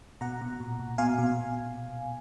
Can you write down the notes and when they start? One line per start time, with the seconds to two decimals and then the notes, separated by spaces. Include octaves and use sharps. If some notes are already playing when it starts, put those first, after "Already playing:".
0.21 B2 F#5 A#5
0.41 B2
0.60 A#2
0.80 A#2
0.98 B2 F5 G#5
1.18 B2